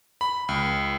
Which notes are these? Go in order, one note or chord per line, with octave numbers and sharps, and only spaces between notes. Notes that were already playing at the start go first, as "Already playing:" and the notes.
B5
C#2